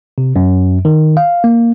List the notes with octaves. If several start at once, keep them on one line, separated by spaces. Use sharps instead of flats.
C3
F#2
D#3
F5
A#3